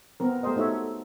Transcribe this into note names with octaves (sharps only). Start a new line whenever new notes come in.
B3 C4 A#4
A3 B3 G4 A#4 C5 D#5
A3 D#4 F#4 C#5 E5